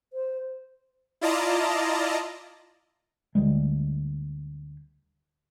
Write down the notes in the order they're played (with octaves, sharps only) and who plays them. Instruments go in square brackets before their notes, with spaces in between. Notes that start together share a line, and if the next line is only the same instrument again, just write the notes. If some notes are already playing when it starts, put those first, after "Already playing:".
[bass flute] C5
[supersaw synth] E4 F4 D5 D#5 A5 A#5
[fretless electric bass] D2 G3 G#3